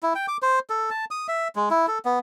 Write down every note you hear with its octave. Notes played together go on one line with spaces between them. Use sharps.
E4
G5
D6
C5
A4
A5
D#6
E5
G#3
E4
A4
B3